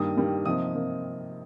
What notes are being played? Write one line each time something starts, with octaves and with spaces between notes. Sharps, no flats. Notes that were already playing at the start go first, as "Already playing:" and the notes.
Already playing: G2 D#3 G3 A#3 D#6
G2 D#3 G3 A#3
C3 F3 A#3 D#4 D#6
C3 F3 A#3 D#4